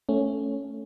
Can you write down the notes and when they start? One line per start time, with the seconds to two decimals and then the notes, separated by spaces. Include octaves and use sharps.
0.09 A3 C#4